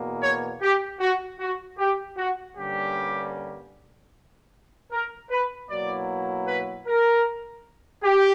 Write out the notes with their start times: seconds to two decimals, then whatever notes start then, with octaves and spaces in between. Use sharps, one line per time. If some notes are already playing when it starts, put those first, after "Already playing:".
Already playing: E2 B2 A#3
0.23 C#5
0.62 G4
1.00 F#4
1.40 F#4
1.79 G4
2.17 F#4
2.57 G2 D3 G3 A#3 C#4 G4
4.92 A#4
5.30 B4
5.69 B2 F#3 A#3 E4 D5
6.48 B4
6.88 A#4
8.04 G4